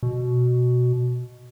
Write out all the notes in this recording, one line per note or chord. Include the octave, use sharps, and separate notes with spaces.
B2